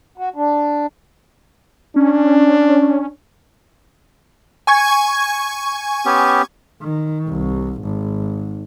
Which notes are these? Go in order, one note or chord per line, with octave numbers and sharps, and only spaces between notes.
F#4
D4
C#4 D4
G#5 C#6 G#6
B3 C#4 G4
D#3
C2
G#1